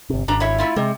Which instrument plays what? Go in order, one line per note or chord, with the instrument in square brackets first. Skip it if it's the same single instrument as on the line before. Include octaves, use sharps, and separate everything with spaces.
[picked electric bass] G1 C3
[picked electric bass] G#1 [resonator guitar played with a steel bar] D4 A#5
[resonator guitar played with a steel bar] E4 C#5 E5
A3 E4 F4
[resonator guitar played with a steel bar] C3 [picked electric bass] G#3